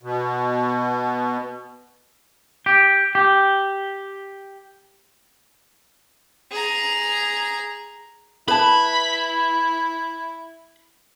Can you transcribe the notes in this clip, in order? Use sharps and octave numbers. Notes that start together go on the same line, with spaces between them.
B2
G4
G4
G#4 A#5
E4 B4 A5 B5